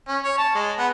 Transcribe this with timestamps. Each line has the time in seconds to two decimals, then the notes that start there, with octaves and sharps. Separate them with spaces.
0.08 C#4
0.23 C#5
0.38 A5
0.55 G#3
0.78 B3